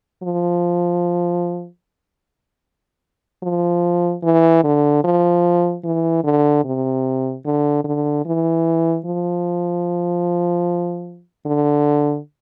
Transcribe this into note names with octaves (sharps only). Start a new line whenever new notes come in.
F3
F3
E3
D3
F3
E3
D3
C3
D3
D3
E3
F3
D3